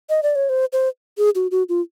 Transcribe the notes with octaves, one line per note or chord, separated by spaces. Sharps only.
D#5
D5
C#5
C5
C5
G#4
F#4
F#4
F4